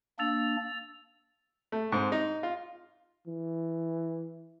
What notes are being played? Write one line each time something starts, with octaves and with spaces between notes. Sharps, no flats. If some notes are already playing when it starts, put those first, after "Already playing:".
A#3 D4 E6 A6 F7
A3
G#2 C4
D#4
F4
E3